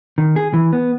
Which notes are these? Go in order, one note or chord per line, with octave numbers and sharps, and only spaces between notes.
D#3
G#4
E3
B3